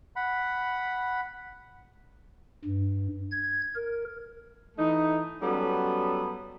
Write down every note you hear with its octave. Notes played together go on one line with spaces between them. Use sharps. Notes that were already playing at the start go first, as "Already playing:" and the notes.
F#5 B5
G2
G#6
A#4
E3 A3 D#4
F#3 G3 B3 C#4 A4